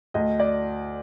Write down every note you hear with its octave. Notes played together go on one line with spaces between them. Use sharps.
D2 D#5
D5